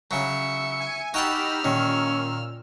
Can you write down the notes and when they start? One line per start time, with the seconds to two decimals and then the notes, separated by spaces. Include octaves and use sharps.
0.11 C#3 F#3 E5 C#7
0.80 G#5
1.14 D#4 F#4 G4 G5 A5 B5 E6 F6
1.64 A#2 D#3 C#4